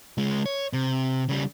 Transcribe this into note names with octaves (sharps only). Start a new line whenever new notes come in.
C#2 G#3
C#5
C3
C#3 G3